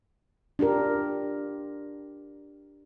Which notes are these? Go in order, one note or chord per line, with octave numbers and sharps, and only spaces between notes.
D4 F4 G4 A#4